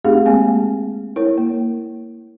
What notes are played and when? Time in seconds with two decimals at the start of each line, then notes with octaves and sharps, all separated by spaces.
0.05 A3 C4 D#4 G4 G#4 F5
0.26 G#3 A#3 C4 G#5
1.16 E4 A#4 C#5
1.38 A#3